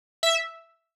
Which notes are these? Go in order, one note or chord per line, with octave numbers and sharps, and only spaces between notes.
E5